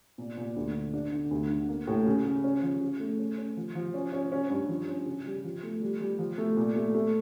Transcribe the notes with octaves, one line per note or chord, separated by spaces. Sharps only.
A#2
A#2
D2
D3
D4
D3
D2
D3
A#3
A2
C#3
C#3
C#4
F3
C#3
A3
C#4
C#4
F3
F3
C#4
C#4
C#4
G2
F3
C#4
C#3
G3
F3
A3
G3
G3
F3
A3
A#2
A3
A3